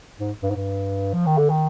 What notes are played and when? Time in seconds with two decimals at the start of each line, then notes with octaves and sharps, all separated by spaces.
0.19 G#2
0.42 G2
0.51 G#2
0.55 G2
1.14 F3
1.26 D#3
1.37 D3
1.49 D#3